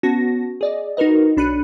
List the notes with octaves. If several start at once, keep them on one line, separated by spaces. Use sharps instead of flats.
B3 C#4 F#4 A5 A#6
G#4 D5 D#5
D#4 F#4 A#4 B4 D#5
B1 D4 B5 F#6 C#7 D#7